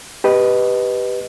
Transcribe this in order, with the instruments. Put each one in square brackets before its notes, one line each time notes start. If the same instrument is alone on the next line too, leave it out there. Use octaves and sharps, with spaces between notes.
[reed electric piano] G4 B4 D#5